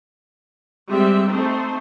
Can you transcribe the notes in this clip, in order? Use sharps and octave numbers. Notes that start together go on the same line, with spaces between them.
G3 G#3 C4 E5
A3 C4 D#4 C5